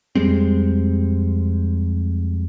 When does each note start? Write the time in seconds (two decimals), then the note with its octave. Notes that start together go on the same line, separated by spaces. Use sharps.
0.15 F2 G3 G#3 C4